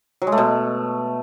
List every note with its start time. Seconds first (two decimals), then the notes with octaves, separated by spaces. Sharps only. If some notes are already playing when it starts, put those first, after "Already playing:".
0.22 F#3
0.27 G#3
0.32 A3
0.38 B2